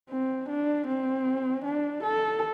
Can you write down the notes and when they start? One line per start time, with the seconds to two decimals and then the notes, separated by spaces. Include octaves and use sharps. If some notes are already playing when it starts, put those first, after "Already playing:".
0.10 C4
0.49 D4
0.87 C4
1.64 D4
2.03 A4